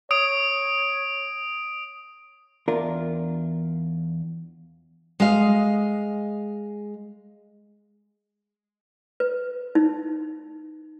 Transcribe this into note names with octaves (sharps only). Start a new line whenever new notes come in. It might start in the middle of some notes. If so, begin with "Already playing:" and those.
C#5 D#6 D7
E2 D4 F4 A#4
G#3 D#5 F5
B4
D#4